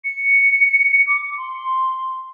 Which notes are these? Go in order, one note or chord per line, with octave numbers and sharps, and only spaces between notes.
C#7
D6
C6